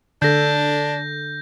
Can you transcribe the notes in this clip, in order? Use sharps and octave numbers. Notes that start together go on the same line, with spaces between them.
D3 D4 A4 G6 A#6